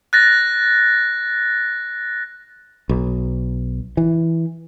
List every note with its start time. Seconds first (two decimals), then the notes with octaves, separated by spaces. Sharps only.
0.13 F#6 A6 A#6
2.89 B1
3.97 E3